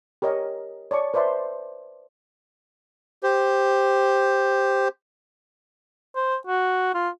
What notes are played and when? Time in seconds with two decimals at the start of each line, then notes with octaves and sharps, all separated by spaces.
0.22 G4 A#4 C#5 D#5
0.91 C#5 D5 A5 C#6
1.14 B4 C5 D5 E5 A5 C6
3.23 G4 C5
6.15 C5
6.47 F#4
6.94 F4